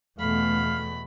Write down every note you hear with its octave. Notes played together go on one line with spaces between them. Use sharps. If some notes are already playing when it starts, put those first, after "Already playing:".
E2 B2 A3 F5 B5